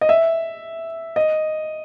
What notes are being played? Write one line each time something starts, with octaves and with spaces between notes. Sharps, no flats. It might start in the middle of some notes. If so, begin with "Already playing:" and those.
D#5
E5
D#5